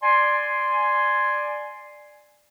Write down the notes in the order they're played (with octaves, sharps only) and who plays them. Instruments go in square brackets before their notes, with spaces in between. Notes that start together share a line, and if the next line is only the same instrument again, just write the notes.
[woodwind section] D5 G#5 C6